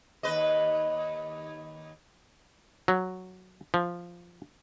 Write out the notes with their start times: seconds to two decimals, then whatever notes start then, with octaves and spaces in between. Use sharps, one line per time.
0.23 D#2 B4 D#5
2.88 F#3
3.74 F3